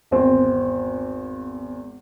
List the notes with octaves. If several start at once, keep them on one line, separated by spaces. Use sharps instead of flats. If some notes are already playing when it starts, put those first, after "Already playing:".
G#1 E2 C4